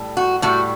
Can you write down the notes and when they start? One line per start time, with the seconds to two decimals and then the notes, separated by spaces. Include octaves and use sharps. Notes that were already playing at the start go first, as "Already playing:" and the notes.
Already playing: A2 G3
0.17 F#4
0.42 A2 G3 F#4